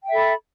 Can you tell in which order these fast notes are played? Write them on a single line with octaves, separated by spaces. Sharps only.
G5 E5 A4 B5